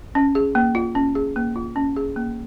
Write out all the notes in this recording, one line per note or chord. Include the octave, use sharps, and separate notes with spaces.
C#4
G#4
A#3
F4
C#4
G#4
A#3
F4
C#4
G#4
A#3